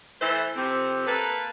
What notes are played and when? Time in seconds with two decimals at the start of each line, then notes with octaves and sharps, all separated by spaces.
0.20 E3 A3 E4 C5
0.56 F2 C3 C4
1.07 A#3 A4 B4